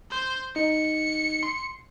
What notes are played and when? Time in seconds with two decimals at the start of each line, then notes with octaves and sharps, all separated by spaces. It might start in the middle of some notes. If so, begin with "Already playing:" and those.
0.11 C5
0.56 D#4 C#7
1.43 C6